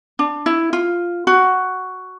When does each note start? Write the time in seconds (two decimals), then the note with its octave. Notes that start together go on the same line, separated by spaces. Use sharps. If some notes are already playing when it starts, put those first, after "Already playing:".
0.19 D4
0.46 E4
0.73 F4
1.27 F#4